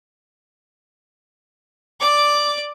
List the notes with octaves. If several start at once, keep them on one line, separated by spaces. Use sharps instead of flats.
D5 D6